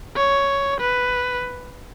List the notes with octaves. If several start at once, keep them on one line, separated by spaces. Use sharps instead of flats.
C#5
B4